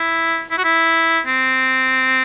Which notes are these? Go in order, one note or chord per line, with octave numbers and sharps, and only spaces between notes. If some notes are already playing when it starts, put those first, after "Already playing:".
Already playing: E4
E4
F#4
E4
C4